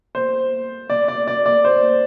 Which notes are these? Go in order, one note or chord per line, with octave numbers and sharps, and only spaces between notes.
C5
D5
D5
D5
D5
C5